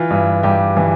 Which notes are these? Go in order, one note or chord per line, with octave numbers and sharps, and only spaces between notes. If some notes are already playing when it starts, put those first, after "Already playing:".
Already playing: E3 F4
G2
G2 G4
E3